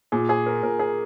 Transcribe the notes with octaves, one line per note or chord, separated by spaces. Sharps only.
A#2 G#4
G#4
A#4
A#2 A#4
G#4